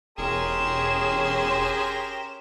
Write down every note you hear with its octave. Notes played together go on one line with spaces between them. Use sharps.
E1 C#4 G4 G#4 A#4 C6 E7